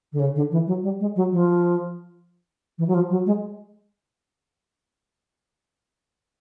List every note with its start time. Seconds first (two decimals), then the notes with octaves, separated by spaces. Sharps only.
0.12 D3
0.19 C#3
0.35 D3
0.51 E3
0.67 F#3
0.83 G3
1.00 G#3
1.15 F#3
1.31 F3
2.78 E3
2.87 F#3
2.94 F3
3.10 F#3
3.26 G#3